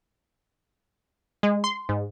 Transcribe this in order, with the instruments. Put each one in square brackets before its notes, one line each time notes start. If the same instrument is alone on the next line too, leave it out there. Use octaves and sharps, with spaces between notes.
[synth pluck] G#3
C6
G#2